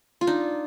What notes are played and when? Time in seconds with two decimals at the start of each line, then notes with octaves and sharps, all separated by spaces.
0.21 F4
0.27 D4 D#4